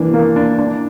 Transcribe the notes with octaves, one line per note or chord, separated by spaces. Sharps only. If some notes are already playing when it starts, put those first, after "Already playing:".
Already playing: E3 A#3 D4
A#3
D4
D4